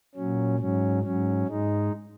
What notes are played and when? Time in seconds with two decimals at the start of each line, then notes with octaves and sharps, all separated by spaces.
0.15 A#2 F#3 C#4
0.59 G#2 F#3 C#4
1.03 G#2 F#3 C#4
1.47 G#2 G#3 D#4